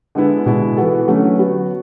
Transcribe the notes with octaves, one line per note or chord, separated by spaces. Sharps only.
D3 G#3 B3 E4
B2 G#3 B3 E4
E3 B3 F#4 A4
D3 F#3 A3 C#4
F#3 B3 F#4